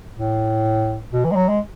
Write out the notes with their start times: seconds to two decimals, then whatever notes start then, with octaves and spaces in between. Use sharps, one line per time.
0.16 A2
1.13 B2
1.24 E3
1.32 G#3
1.36 F#3
1.49 G#3